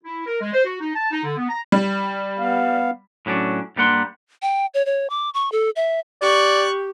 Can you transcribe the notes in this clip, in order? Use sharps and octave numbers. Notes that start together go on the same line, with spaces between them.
E4
A#4
G#3
C5
F#4
D#4
A5
D#4
D3
B3
A#5
G3
B3 F5
A2 F#3 C#4 D4
G2 G3 A#3 F#5 C6
G5
C#5
C#5
D6
C#6
A4
E5
G4 D5 C#6 F#6